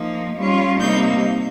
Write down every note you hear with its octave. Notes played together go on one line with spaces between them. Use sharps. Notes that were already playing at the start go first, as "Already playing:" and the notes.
Already playing: F3 A#3 D#4
G3 C#4 F4
C3 G3 A#3 D#4 G6